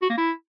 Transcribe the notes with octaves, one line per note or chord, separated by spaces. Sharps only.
F#4
A#3
E4